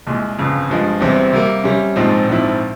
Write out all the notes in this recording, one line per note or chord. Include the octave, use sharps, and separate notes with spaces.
C2 A#2 G#3
G1 F2 C#3
G2 F3 G#3
E1 E2 C3 G3 C4
C3 G3 A#3
C3 G3 C#4
A#1 G#2 F3 G#3 C4
A#1 G#2 F3 C4 E4